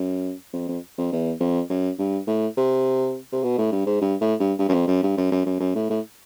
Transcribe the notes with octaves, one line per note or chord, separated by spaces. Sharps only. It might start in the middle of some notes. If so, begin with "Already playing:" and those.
Already playing: F#2
F2
F2
F2
E2
F2
F#2
G2
A2
C3
C3
B2
A2
G2
G#2
G2
A2
G2
G2
F#2
F2
F#2
G2
F#2
F#2
F#2
F#2
A2
A2